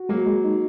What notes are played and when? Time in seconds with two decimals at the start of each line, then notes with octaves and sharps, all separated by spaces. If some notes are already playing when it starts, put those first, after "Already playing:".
Already playing: F#4
0.09 F#3 G#3 A#3
0.26 G#3
0.44 D#4